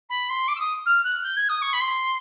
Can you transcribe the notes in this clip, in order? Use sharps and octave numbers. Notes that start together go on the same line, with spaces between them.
B5
C6
D6
E6
D#6
F6
F#6
G6
G#6
D#6
C#6
B5
C6